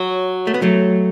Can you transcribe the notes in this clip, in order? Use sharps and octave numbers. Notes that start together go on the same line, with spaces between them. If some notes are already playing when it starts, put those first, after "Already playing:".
Already playing: F#3
A3
B3
F#3 A3